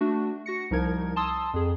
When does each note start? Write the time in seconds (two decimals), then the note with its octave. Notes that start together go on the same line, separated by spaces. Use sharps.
0.01 A3 D4 F#4
0.46 F#4 A#6 C#7
0.71 C2 F3 D#4 A#4 G#6
1.16 A5 C6 D#6 E6
1.53 F2 G#4